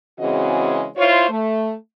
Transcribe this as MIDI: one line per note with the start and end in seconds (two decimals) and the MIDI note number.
0.20 0.86 49
0.20 0.86 52
0.20 0.86 56
0.20 0.86 60
0.20 0.86 66
0.20 0.86 75
0.97 1.26 64
0.97 1.26 65
0.97 1.26 72
0.97 1.26 73
1.30 1.73 57